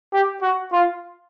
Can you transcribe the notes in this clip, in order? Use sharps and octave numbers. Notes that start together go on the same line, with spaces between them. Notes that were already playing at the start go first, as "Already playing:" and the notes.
G4
F#4
F4